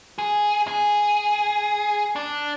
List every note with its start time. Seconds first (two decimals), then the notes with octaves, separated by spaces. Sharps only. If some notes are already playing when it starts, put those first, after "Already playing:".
0.19 G#4
0.68 G#4
2.16 D4